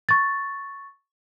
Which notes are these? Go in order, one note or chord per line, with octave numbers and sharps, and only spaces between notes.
C#6 A6